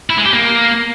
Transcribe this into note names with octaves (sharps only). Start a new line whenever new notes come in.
E4
G#3
G4
A#3